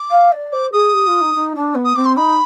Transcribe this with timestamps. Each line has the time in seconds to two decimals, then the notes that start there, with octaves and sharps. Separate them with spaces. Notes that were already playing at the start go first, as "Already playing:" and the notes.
Already playing: D6
0.10 F5
0.32 D5
0.52 C5 D6
0.72 G#4 D#6
0.93 G4
1.06 F4
1.20 D#4
1.34 D#4
1.55 D4
1.74 B3
1.85 D#6
1.95 C4 D6
2.05 C6
2.16 D#4 B5